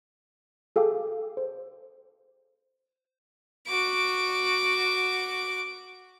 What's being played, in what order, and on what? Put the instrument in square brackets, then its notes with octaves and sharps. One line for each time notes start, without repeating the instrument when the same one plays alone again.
[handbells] G#4 A4 F5 G5 D6
C5
[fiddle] F#4 D6